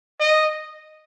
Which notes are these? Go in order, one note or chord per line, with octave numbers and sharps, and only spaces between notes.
D#5